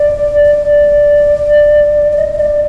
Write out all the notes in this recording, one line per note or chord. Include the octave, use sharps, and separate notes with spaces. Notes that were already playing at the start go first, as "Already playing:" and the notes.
Already playing: D5
D5
D5
D#5
D#5
D5